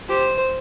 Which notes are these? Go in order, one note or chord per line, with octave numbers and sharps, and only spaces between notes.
G4 C5